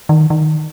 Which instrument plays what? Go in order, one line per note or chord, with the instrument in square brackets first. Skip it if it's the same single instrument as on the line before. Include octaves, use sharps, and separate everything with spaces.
[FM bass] D#3
D#3